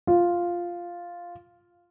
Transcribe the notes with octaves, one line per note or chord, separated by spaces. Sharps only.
F4